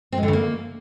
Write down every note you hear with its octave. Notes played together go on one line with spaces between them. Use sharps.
C4
G#3
D3
C#3
A#3